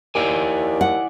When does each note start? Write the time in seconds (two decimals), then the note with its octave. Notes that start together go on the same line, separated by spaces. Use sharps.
0.15 D#2 E4 D5 G#5
0.81 F#5